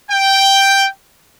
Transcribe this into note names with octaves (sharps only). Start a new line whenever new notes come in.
G5